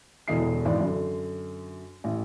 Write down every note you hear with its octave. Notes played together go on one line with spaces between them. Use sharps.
E1 E2 D3 D#5 C7
G#1 E3 D5
F#2 D3
A1